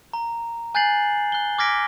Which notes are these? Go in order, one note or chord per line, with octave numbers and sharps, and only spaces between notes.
A#5
G#5 F#6 G6 A6 C7 F#7
F#6 G7
D6 F6 G#6 A#6 B6 D7